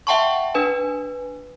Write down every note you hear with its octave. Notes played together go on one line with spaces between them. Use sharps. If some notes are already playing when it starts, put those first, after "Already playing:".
E5 F#5 G5 A5 C6 C#6
D4 B4 G#5